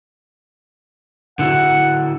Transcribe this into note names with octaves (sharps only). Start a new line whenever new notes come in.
D3 E4 F#4 F#5